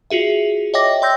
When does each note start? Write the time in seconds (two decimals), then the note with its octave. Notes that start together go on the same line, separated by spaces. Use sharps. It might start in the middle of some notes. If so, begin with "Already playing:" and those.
0.10 F4 F#4 G#4 E5
0.74 C#5 D#5 E5 G5 D6 A#6
1.02 D5 G5 C6 E6 G6 A#6